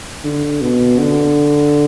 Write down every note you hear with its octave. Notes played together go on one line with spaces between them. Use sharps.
D3
B2
D3